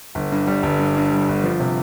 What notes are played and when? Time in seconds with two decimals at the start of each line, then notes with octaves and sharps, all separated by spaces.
0.15 G1
0.32 G2
0.47 G3
0.63 G1
0.79 G2
0.97 G2
1.11 G3
1.29 G1
1.44 F3
1.60 C3